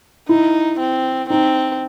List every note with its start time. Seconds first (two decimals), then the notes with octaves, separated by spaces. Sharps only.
0.28 D#4 E4
0.80 C4
1.30 C4 D#4